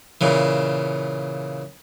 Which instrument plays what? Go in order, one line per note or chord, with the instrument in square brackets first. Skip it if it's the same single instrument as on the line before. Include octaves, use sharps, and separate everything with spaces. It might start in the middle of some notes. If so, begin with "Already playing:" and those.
[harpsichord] A#2 C#3 E3